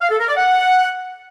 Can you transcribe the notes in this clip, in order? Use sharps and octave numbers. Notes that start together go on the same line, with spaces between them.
F5
A4
A#4
D5
F#5